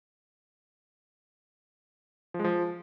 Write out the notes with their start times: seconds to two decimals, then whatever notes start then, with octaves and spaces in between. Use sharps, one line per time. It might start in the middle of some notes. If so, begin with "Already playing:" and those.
2.34 F3
2.39 G#3
2.44 F3